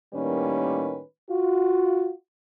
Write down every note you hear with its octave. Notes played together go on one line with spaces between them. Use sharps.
A2 D#3 G3 A#3 C#4 B4
F4 F#4